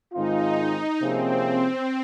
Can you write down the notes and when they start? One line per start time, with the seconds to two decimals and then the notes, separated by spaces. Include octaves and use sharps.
0.14 G#2 D#3 G#3 C4 D#4 F4
1.01 C3 F3 A#3 C4 C#4 G#4